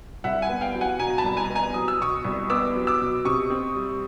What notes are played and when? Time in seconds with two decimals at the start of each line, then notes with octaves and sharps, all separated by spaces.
0.24 C2 E5 F#5
0.42 F#5 G#5
0.49 B3
0.61 F5 G5
0.74 F#3
0.81 F#5 G#5
0.99 B2 G#5 A#5
1.10 A#5
1.18 A5 B5
1.24 C2
1.37 G#5 A#5
1.50 B3
1.55 G#5 A#5
1.74 F#3 D#6
1.88 E6
2.00 B2 C#6 D#6
2.25 C2
2.50 B3 D6 E6
2.75 F#3
2.87 D6 E6
3.01 B2
3.25 C3 C#6 D#6
3.50 C4
3.76 G3